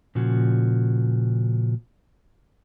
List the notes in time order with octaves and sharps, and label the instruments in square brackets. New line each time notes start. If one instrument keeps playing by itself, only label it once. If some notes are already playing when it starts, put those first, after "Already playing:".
[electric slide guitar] A#2 C#3 F3 F#4